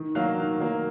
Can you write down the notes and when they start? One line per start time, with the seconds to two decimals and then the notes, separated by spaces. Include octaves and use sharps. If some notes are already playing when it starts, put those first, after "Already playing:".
Already playing: D#3
0.15 F#3 A#3 F5
0.38 D#3
0.60 F#3 A#3